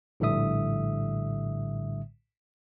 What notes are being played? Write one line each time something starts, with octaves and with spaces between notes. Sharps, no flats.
A#1 A2 D3 G3 E5 D#6